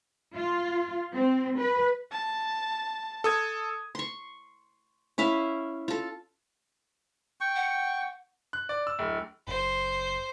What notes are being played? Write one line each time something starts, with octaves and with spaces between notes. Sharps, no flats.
F4
C4
B4
A5
A4 D#6 G#6
C6 C#6
C#4 E4 E5 F5
F4 A4
G5 C#6
F#5
F#6
D5
E6
D1
F#1 C5